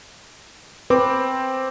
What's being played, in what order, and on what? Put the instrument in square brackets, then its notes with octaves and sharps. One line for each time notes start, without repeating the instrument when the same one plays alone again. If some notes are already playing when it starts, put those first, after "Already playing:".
[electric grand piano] C4 D6 [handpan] B4